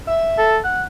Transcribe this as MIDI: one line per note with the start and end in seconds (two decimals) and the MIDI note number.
0.08 0.56 76
0.38 0.59 69
0.64 0.84 78